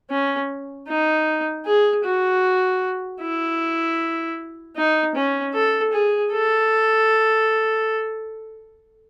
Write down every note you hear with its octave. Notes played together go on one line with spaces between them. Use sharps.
C#4
D#4
G#4
F#4
E4
D#4
C#4
A4
G#4
A4